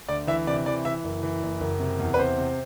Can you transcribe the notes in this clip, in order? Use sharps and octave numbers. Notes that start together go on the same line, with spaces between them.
D2 D5
E3 E5
C3 D5
E3 D5
E3 E5
F#1
E3
F#1
F#1
C3
E2
B4
C3 C5
C3